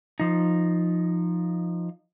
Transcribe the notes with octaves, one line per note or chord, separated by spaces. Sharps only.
F3 D#4